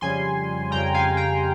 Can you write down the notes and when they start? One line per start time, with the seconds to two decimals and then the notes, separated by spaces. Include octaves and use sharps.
0.01 F2 C#3 G3 G#5 C6
0.71 F2 C#3 G3 G5 A#5
0.94 F5 G#5
1.17 G5 A#5